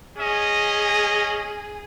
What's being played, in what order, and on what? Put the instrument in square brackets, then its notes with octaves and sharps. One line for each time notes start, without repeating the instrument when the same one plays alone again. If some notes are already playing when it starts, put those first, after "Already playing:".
[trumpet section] C#4 D#5 [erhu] G#4